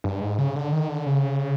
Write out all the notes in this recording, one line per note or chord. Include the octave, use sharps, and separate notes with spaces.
G2
G#2
C#3
D3
D#3
D3
C#3